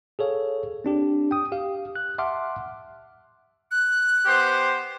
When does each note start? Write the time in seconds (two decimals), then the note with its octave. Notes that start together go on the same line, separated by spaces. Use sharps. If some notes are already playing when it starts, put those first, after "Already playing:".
0.19 G#4 A4 C#5 F5
0.84 C4 D4 G4
1.31 G5 D#6
1.52 G4 F5
1.96 F#6
2.18 E5 F#5 A5 C6 D6 F6
3.71 F#6
4.26 B3 G4 C5